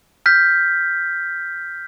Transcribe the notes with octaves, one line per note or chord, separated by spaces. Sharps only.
F6 G6 B6